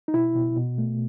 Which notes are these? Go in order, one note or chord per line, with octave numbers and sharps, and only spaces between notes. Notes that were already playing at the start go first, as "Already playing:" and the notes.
D#4
B2 E4
B2
B2
A3